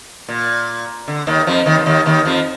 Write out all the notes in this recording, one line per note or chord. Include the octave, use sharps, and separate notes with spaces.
A#2
D3
D#2 D#3
F2 F3
D#2 D#3
F3
D#2 D#3
D#2 D#3
F2 F3